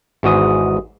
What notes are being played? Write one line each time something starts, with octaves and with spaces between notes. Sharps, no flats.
G#1 E2 G#2 F#4 D#5 D#6